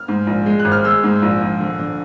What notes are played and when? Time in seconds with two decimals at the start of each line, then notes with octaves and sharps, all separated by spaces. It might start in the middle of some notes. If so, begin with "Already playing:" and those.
Already playing: F6
0.08 G#2
0.27 A#1
0.46 G#3
0.59 F#6
0.65 G#1
0.72 F6
0.84 G#3 E6
1.04 G#2
1.22 A#1
1.42 A#1
1.60 D3
1.79 D3